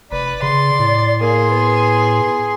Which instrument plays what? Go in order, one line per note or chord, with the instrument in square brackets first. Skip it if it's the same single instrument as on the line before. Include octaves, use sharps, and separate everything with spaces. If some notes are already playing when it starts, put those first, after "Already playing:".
[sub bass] F1 [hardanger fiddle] B4 [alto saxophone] D5
[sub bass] C#3 [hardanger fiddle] C6
[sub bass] A2
[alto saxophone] A#3 [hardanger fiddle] G#4 C6
[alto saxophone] B3